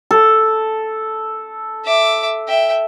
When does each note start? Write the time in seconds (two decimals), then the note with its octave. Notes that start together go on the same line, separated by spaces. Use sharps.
0.11 A4
1.84 E5 D6
2.48 E5 G5